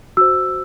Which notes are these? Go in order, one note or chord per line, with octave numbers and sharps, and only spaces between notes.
F#4 C5 E6